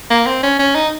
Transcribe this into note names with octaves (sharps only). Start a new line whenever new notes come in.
A#3
C4
C#4
C#4
D#4